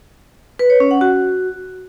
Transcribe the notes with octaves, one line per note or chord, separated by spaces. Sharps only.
B4
C#5
C#4
F#5
F#4